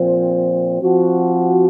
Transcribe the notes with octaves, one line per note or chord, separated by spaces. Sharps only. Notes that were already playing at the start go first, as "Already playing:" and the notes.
Already playing: A#2 F3 C4
F3 C4 F#4